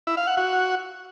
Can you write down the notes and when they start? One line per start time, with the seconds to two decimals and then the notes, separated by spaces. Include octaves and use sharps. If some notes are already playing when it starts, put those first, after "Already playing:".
0.07 E4
0.17 F5
0.27 F#5
0.37 F#4